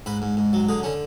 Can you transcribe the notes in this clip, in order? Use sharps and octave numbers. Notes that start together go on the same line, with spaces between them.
G#2 B4
G#2
G#2
F#3
D3 G#4
D3 C#4